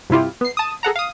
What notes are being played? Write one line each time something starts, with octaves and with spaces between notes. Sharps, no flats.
G2 C3 E4 F4 G4
B3 C7
A5 D#6
G#4 A4 F#5 A#5
F5 D#6